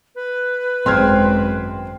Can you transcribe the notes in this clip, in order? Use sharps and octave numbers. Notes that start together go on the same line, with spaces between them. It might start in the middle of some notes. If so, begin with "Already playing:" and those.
B4
G#1 F#2 C4 C6 F6 G#6